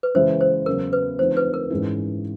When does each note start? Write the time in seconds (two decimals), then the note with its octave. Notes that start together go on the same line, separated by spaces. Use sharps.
0.03 B4
0.15 C#3 E3 G#3 C5
0.41 C5
0.66 E2 C#3 F#3 B3 A#4
0.93 B4
1.19 D3 F3 A3 C4 D#4 C5
1.37 B4
1.54 A#4
1.70 G#2 E3 G#3 C#4 E4